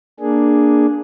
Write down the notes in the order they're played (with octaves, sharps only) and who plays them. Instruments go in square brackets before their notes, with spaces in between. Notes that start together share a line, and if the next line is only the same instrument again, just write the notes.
[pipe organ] A#3 D4 G#4